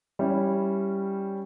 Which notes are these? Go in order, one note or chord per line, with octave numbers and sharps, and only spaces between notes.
G3 C#4 E4